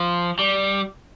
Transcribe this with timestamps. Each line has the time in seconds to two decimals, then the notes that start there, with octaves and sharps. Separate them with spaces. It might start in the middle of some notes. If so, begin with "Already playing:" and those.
Already playing: F3
0.39 G3